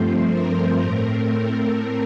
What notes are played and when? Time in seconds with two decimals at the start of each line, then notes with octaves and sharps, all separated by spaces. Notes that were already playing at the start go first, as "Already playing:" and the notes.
Already playing: G2 F3 A3 C4 C5
0.30 A#4
0.81 A2 A3 C4